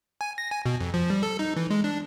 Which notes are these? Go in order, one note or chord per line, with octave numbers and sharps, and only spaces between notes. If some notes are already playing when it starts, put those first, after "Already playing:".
G#5
A#6
G#5
B2
F2
F3
G3
A4
D#4
E3
G#3
D4